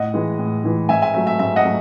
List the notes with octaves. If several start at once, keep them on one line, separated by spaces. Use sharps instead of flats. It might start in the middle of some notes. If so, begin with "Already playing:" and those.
Already playing: A2 D#5 F#5
E3 G#3
A2
E3 G#3
G#2 E5 G#5
E5 G#5
F#3 A3 E5
E5
G#2 E5
D#5 F#5
F#3 A3